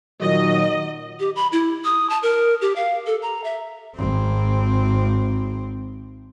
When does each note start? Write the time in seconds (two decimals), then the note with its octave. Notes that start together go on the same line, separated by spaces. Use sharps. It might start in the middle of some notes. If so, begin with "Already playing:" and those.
0.22 A#2 D#3 F#3 D#5
1.20 G4
1.36 B5
1.52 E4
1.84 D#6
2.10 A5
2.23 A#4
2.61 G4
2.76 F5
3.07 A4
3.22 A#5
3.44 E5
3.96 G#1 C4